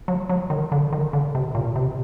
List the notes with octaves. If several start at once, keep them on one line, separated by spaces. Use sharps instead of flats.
F#3
F#3
D#3
D3
D#3
D3
C3
A#2
C3